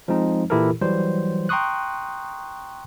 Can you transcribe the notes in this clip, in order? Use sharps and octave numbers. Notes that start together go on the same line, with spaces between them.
F3 G#3 C4 D#4
A#2 E3 E4 G4 A4 A#4
E3 F#3 G3 C5
G5 A#5 C6 C#6 D#6 F#6